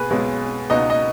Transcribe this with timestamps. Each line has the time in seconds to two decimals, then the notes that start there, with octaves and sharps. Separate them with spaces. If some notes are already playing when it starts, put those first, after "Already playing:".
Already playing: B2 G#4 B4
0.10 B1 B2 G#3 C#4
0.70 C#2 B2 B3 D#4 D#5
0.90 D#5